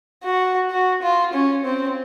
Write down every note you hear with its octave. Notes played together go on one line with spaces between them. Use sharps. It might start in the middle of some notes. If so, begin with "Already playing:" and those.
F#4
F#4
F4
C#4
C4